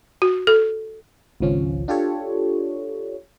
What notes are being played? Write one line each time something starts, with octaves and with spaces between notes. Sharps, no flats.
F#4
A4
G#1 C#2 F3 C#4
D4 F4 G4 A4 C#5